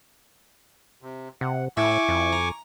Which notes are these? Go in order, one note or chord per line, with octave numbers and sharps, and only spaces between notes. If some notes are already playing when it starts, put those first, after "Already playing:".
C3
C3 F#5
A2 E4 G#5 C#6 D6
F2
A#5